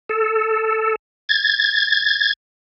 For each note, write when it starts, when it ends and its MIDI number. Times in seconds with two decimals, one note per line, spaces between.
0.09 0.95 69
1.29 2.33 92
1.29 2.33 93